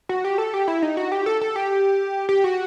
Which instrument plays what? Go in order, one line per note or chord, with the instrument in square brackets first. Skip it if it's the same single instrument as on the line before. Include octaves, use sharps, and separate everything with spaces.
[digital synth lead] F#4
G4
A4
G4
E4
D#4
F#4
G4
A4
A4
G4
G4
F#4